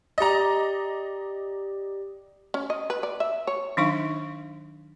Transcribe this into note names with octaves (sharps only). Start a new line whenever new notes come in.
G4 D5 D#5 A#5
C#4
D#5
B4
D5
E5
C#5
D#3 F#3 D4 D#4 F5 C#6